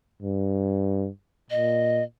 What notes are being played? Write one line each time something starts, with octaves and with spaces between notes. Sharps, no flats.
G2
A#2 D#5